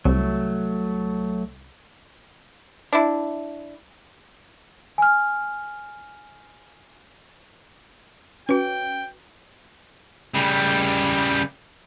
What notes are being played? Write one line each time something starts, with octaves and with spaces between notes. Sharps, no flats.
C2 F#3 A3
D4 E4
G#5 F6
C#4 F#4 B4 G5
C#3 G3